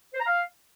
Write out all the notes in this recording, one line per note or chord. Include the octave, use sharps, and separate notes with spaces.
C5
A#5
F5